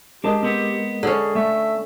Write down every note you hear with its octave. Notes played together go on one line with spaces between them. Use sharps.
G#3 D4 G4 A#4 D#5 A5
B3 C4
D3 C#4 G#4
A3 E5